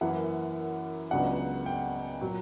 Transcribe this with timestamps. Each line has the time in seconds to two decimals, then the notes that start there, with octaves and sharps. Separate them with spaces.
0.01 F#2 E3 A#3 F#5
1.11 C#2 C#3 F#3 B3 D4 F#5
1.66 G5
2.21 A#2 F#3